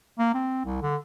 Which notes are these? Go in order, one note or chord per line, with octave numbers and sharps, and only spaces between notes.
A#3
C4
C2
D3